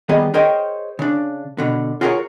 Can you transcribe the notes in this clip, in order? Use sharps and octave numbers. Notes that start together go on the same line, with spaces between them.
D#3 G3 B3 G#4 D#5
G#4 A#4 C5 C#5 D#5 G5
C#3 D4
B2 D3
F4 F#4 G#4 A#4 B4 C#5